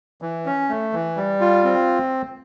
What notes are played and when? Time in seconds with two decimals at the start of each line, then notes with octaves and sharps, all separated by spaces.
0.22 E3
0.46 C#4
0.69 A3
0.93 E3
1.17 G3
1.41 F4
1.64 C4